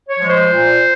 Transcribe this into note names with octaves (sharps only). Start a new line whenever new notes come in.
C#5
F3 G#3
C5
A#2